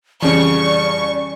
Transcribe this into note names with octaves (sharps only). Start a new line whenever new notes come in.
F2 C#3 E3 G3 C#4 D5 C#6